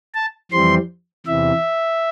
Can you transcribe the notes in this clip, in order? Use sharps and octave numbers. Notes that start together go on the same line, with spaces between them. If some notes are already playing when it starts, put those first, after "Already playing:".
A5
F2 E3 G3 C4 C6
E2 C3 E3 E5